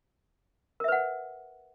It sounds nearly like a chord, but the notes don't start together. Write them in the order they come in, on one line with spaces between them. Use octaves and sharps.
A#4 E5 B4 F#5